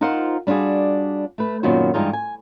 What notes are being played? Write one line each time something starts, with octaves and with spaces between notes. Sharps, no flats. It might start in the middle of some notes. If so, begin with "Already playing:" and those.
D#4 F4 A#4 C5 F#5
G3 D4 F4 F#4 G#4
A3 B4
F#2 A#2 D#3 B3 F#4 C5
G2 E3 G#3 D#4 F4
G#5